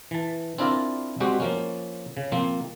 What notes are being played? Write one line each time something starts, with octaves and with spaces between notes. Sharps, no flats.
E3 A5
C4 D4 E4 F4 A#4 D5
G3 G#3 C4 F#4 G4
F3 A#3 C#4
C#3
F3 A#3 C4